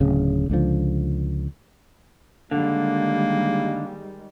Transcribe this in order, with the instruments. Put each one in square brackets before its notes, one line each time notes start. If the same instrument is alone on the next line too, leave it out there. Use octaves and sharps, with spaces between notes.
[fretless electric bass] D1 C#3
C#2 D3 F3
[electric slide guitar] D3 [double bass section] D#3 G3 G#3 [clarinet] A#3